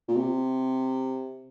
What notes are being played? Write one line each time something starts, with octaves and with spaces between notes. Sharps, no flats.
A#2
C3